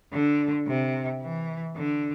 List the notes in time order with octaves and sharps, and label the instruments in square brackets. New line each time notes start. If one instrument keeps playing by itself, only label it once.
[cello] D3
C3
E3
D3